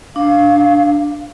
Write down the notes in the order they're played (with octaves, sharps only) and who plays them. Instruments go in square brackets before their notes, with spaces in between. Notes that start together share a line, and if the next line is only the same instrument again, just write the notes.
[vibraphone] D4 [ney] F5